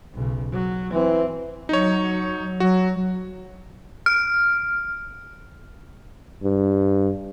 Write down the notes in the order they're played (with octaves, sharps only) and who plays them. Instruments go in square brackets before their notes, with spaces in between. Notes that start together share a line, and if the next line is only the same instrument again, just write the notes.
[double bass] B1 C#3
F#3
[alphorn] E3 [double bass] C4
[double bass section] F#3 [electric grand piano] D#4 C#5
[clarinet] F#3 [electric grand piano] F#4
[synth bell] F6
[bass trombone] G2